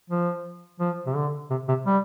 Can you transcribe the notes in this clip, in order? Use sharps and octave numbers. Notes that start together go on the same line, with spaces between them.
F3
F3
C3
D3
C3
C3
G3